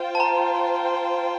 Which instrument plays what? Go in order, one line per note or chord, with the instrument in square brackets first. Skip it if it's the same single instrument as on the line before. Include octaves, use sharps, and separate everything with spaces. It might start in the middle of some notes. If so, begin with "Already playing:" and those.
Already playing: [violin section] F4 C5 G5
[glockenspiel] A5
A#5